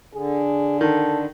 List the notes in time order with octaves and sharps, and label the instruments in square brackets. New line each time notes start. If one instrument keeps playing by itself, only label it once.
[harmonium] D3 [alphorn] G#4
[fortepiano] D#3 [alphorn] A4